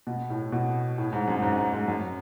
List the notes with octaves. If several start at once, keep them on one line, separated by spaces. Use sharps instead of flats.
B2
A2
B2
A2
G#2
F#2
G#2
G#2
G#2
F#2